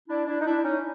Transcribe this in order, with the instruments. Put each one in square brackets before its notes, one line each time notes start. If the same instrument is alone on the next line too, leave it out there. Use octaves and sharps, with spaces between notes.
[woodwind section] D4 E4
D4 E4
D#4
D4 E4
C#4 D#4